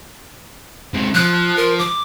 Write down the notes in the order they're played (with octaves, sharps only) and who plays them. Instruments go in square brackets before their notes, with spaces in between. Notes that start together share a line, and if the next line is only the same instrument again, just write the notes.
[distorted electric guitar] C3 G#3
[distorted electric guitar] F3 [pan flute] F#6
[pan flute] A#4
D6